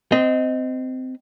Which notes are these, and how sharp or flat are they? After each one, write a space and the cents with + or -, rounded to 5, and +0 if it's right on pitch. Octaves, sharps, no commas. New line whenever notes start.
C4 -20 D#5 +5